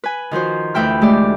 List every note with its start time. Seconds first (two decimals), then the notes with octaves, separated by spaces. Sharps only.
0.04 B4 G#5
0.31 D#3 F3 F#4 C5
0.74 D2 E3 E5 G5 B5 F6
1.01 G#3 A3 G4 D5